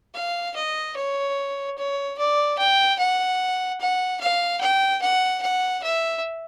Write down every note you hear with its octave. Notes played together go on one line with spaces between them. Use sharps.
F5
D#5
C#5
C#5
D5
G5
F#5
F#5
F5
G5
F#5
F#5
E5